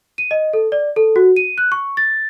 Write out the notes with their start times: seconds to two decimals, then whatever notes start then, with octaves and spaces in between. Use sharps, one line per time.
0.18 D#7
0.31 D#5
0.53 A4
0.72 D5
0.96 A4
1.16 F#4
1.36 D#7
1.58 F#6
1.72 C#6
1.97 A6